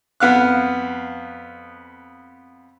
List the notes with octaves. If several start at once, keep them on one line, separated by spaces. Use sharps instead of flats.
F2 B3 F5 F#6